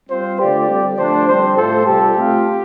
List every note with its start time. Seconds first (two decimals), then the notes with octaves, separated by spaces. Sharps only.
0.10 G3 C4 F4 C5
0.39 D3 A3 F4 G4 A4 D5
0.69 G3 C4 A4 D5
0.98 D3 F3 A3 D4 C5
1.27 D3 G3 C4 G4 C5
1.57 A2 A3 F4 A4 C5
1.86 C3 G3 F4 G4 A4
2.16 A3 C4 F4